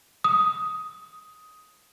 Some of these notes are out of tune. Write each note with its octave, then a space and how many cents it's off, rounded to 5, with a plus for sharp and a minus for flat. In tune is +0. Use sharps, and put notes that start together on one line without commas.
D#6 +10